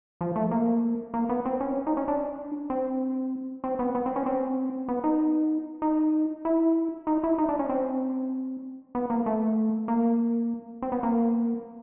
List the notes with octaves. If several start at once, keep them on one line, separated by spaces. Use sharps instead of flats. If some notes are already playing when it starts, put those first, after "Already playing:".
F3
A3
A#3
A#3
B3
C4
C#4
D#4
C#4
D4
C4
C4
B3
B3
C4
C#4
C4
B3
D#4
D#4
E4
D#4
E4
D#4
D4
C#4
C4
B3
A#3
A3
A#3
C4
B3
A#3